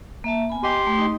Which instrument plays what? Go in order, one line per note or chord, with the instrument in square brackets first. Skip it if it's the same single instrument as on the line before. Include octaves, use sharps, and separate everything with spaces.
[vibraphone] A#3 E5 A5
B3 G#5 B5
[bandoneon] G4 C6 [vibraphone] D#5
[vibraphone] A3
D#4 D#5